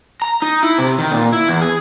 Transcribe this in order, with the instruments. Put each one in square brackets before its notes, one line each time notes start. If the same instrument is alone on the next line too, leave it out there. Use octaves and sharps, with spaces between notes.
[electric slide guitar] A#5
D#4
E4
C3
D#3
A#2
E4
E2
G#4